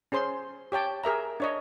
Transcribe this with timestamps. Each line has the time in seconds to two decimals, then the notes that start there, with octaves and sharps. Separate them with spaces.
0.12 C#4 G#4 C5 C6
0.72 G4 C#5 G5 A5
1.03 G#4 A#4 E5 A#5
1.40 D4 C#5 D#5